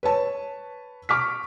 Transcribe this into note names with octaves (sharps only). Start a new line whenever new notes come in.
B4 C#5 A5
C#6 D6 F6 B6